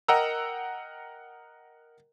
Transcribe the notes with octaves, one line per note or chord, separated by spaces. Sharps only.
A#4 D#5 F#5 G5 A#5 E6